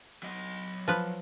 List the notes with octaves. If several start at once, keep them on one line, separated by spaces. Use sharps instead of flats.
F#3 D#5
F3 B4